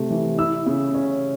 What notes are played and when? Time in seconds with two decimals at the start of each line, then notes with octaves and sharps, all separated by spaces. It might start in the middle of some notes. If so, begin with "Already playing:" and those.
Already playing: C3 A3 C4
0.10 E3
0.38 E4 E6
0.66 C#3
0.94 C#4